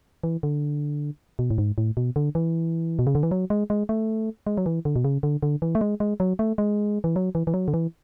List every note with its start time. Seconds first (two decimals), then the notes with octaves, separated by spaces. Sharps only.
0.24 E3
0.43 D3
1.39 B2
1.51 A2
1.58 G#2
1.78 A2
1.97 B2
2.16 D3
2.35 E3
2.99 B2
3.07 C#3
3.15 D3
3.23 E3
3.31 F#3
3.50 G#3
3.70 G#3
3.89 A3
4.47 G#3
4.58 F#3
4.66 E3
4.85 D3
4.96 B2
5.05 C#3
5.23 D3
5.43 D3
5.62 E3
5.75 A3
5.81 G#3
6.00 G#3
6.20 F#3
6.39 A3
6.58 G#3
7.04 E3
7.16 F#3
7.35 E3
7.47 E3
7.54 F#3
7.68 D3
7.74 E3